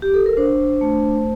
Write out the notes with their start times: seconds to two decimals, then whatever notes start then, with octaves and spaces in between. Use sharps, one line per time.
0.02 G4
0.14 A4
0.26 A#4
0.37 D4 C5
0.81 A3